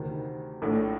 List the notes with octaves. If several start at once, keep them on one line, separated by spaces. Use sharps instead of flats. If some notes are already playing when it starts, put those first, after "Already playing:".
Already playing: D2 C3 D#3
A#1 A2 A3 D4